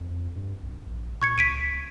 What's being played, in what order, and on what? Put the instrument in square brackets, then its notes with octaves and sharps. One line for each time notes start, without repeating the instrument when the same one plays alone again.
[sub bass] F2
G2
B1
A#1
[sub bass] A#2 [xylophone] C#6 G#6 C#7
[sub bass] C#2 [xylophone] B6 D7 D#7